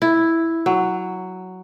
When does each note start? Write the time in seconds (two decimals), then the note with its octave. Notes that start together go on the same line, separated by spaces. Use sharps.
0.02 E4
0.66 F#3